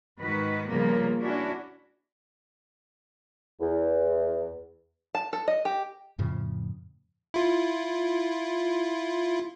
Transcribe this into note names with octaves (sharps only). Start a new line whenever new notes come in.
G#2 D#3 F#4 B4
C#3 F3 G3 A#3 B3
C#4 D4 E4 F#4
E2
A5
A4
D#5
G4
F2 A2 C#3 F3
E4 F4